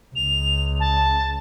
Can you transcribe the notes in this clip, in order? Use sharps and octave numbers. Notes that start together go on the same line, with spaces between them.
C#2 F7
A5